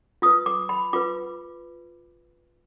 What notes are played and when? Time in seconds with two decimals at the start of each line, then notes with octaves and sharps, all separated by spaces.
0.22 F4 D#6
0.26 B4
0.46 D6
0.69 B5
0.93 F4 B4 D6